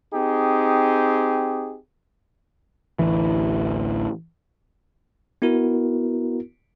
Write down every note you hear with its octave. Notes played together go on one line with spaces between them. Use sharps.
C4 D#4 G4 G#4
A1 D2 E3
B3 E4 F#4 A#4